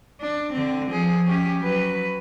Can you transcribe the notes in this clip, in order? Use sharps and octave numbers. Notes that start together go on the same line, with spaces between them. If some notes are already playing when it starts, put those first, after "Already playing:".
D4
D3 C4
F3 G#4
C#4 G4
F#3 B4